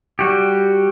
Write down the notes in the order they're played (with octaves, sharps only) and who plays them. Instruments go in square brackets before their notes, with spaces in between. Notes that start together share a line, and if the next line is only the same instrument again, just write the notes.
[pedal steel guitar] G3 F#4 G4